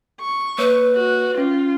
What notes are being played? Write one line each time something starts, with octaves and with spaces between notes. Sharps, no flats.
C#6
A#3 B4 C#5
F#4
C#4 F4